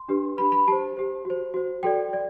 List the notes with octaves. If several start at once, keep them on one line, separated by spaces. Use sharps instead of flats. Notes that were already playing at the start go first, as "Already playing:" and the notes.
Already playing: C6
D4 G4 B4
D4 G4 B4 B5
B5
G4 C5 A5
G4 C5
F#4
C5
F#4 C5
F#4 A4 D5 G5
D5